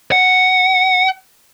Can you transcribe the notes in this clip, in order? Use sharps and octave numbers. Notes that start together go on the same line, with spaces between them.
F#5